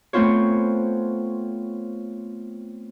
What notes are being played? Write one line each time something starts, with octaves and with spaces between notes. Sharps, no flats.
A3 B3 C4 F4 C5 C#5